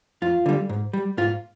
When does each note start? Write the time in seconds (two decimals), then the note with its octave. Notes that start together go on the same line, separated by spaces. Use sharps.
0.22 F2 F4
0.46 D3 G3
0.69 G#2
0.93 G3
1.17 G#2 F4